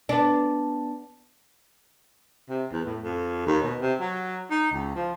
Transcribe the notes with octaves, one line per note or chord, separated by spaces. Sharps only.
B3 D4
C3
E2
A2
F2
D#2
B2
C3
F#3
D#4
C#2
F3